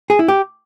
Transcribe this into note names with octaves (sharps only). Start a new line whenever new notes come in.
G#4
E4
G4